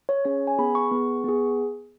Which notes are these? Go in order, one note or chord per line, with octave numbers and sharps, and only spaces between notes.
C#5
C#4 G#4 C#5
G#5
B3 G#4 B5
C#6
B3 G#4
B3 G#4